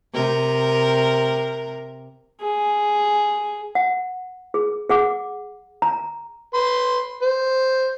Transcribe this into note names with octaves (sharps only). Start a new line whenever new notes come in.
C3 A#4
G#4
F#5
G#4
G#4 F#5 D6
A#5
B4 C6
C5